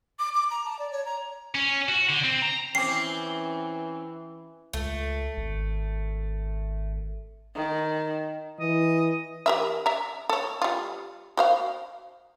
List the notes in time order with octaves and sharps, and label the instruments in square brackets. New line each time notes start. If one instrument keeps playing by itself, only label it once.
[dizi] D6
D6
A#5
A5
D5
C#5
A#5
[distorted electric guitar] C#4
F#4
D3
C4
A#5
[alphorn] E3 [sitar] C4 C#4 [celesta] G5 G#5 D6 [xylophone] C7
[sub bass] C#2 [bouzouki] A3
[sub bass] G#1
[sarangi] D#3
[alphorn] E3 [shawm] D#5
[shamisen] G4 A#4 E5
E5 A#5
A4 C#5
G3 F4
F#4 C5 F5